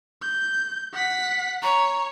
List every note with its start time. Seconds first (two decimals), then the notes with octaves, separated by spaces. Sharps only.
0.22 G6
0.93 F#5 B6
1.63 C#5 A#5